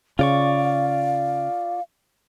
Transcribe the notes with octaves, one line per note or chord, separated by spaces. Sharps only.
C#3 F4 D5 F5 C#6